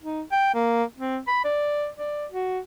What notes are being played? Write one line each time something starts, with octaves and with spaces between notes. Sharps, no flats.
D#4
G5
A#3
C4
B5
D5
D5
F#4